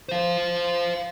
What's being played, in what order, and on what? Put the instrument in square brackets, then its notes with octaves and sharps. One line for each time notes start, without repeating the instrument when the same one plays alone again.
[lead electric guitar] C5 F5